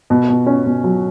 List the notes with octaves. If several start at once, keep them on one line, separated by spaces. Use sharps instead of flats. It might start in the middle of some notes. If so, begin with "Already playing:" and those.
B2
B2
C#4
B2
F#3